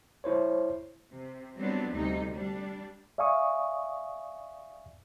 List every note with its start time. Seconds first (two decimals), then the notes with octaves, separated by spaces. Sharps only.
0.24 E4 C5 C#5
1.12 C3
1.56 F#3 G3 A3 B3 C4 D4
1.92 D2 C3 G3 D#4
2.34 G3 D4
3.18 D5 E5 F5 G#5 C#6 D#6